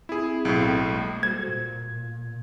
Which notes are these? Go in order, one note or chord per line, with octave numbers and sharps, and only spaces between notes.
C4 E4 G#4
B1 A2
G3 G#3 A#3
F#4 A4 C5 G#6
A#2